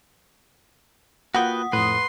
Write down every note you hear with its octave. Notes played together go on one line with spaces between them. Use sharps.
A#3 F4 F#4 B4 F#5 G5 D#6
F2 A2 B4 C6